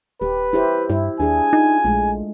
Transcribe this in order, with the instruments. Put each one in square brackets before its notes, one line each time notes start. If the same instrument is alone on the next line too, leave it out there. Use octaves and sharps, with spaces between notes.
[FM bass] D#1 [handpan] G4 [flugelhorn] B4
[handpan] E4 G4 C5
[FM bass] G2 [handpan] E4
[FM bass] D#2 [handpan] D4 G#4 [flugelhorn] G#5
[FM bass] D#4 [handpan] F4
[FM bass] A#1 [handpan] G#3 A3